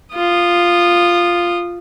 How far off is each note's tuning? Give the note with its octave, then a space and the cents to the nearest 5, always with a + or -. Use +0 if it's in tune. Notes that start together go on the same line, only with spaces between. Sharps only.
F4 +0 D#6 -20